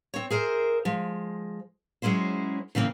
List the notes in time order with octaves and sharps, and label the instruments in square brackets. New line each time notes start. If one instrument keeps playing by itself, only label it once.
[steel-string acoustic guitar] C4 C#5
G#4 A#4 C5 E5
F3 G#3
F#3 G#3 C#4 E4 C5
C#3 E3 A#3 C4